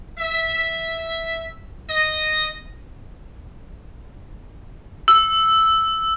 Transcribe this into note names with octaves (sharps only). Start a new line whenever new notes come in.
E5
D#5
E6